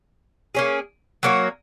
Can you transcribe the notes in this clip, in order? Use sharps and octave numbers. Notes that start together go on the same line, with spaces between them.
A#3 C#4 G#4
F#3 A#3 C#4 F#4